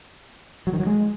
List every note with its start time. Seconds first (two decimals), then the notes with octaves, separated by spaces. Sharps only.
0.67 F#3
0.73 D#3
0.80 F#3
0.86 G#3